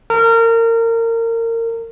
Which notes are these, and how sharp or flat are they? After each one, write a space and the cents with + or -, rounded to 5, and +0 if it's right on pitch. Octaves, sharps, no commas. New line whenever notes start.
A#4 -25